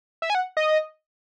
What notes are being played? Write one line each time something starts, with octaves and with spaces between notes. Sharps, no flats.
E5
G#5
F#5
D#5